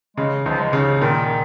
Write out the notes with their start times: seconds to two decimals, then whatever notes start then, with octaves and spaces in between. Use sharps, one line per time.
0.17 C#3 G#3
0.46 C#2 F3
0.60 G#3
0.73 C#3
1.01 A#2 D#3